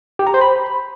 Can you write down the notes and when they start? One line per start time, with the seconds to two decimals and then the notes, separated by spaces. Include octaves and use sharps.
0.19 G4
0.27 A#5
0.34 C5
0.41 B5